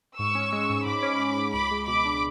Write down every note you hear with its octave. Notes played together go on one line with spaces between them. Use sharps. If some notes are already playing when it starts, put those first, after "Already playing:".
G#2 C#6 E6
C#4
G#3
G#2
G#2 B5 D6
C#4
G#3
G#2
C#2 B5 D6
G#3
B2 B5 D6
D4